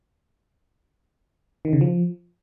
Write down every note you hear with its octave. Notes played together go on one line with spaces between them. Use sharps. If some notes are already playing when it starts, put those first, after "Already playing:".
D#3
C#3
F3